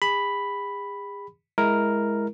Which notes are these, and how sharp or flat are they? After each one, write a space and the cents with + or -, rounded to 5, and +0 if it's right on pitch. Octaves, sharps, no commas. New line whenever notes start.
G#4 -40 B5 +0
G#3 +10 E4 +0 A#4 +0